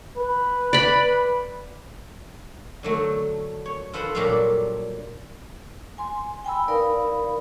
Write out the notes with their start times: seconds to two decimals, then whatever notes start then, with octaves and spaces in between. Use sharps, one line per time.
0.18 B4
0.73 D5 B5
2.83 D3 F#3 A3
3.66 C#5
3.93 F4 A4 B4 C5 F#5
4.15 A#2 F#3 G3 D4 A4 F5
5.98 G#5 C6
6.45 G5 G#5 B5 E6
6.68 D#4 A#4 B4 D5 F5 B5